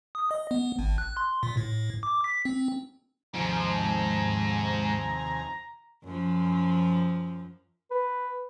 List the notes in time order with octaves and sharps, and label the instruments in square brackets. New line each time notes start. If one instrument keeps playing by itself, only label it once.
[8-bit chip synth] D#6
D#5
B3
G#1
F#6
C6
A#2
A2
D6
B6
C4
[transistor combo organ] D#2 C3 G#5 [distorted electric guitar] G#2 [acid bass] F3 [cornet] A#5
[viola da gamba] F#2 F3
[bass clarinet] B4